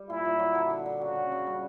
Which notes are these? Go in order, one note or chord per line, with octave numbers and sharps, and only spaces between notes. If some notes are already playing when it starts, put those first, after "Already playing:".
Already playing: G3
A#2 E4
A#2
F#3
D3
D3
D3
C#3 F#4
C#3
C#3
G3